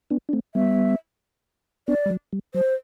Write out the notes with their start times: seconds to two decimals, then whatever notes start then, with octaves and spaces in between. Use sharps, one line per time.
0.10 B3 D4
0.29 D4
0.33 A3 C4
0.55 G3 B3 E5
1.88 B3 D4 D5
2.06 G3
2.10 F#3
2.33 G3
2.54 F#3 C5